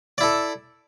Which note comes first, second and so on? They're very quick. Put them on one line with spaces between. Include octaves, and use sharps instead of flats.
D5 E4 A4